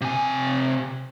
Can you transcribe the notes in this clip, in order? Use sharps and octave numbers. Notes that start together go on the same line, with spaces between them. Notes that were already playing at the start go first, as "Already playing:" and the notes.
C3 G#5